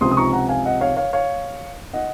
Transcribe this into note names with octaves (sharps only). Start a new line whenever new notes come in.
C#2 C3 F3 C4 C6 D#6
D#6
A#5 C#6
F#5 A#5
F5 G#5
D#5 F#5
C#5 F5
C#5 F5
C#5 F5
D#5 F#5